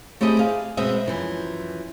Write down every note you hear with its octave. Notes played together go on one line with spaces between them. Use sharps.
A3 C4 E4 G4 G#4 D#5
G#4 F5
B2 G#3 B3 C4 D#5 E5
F#2 E3 F3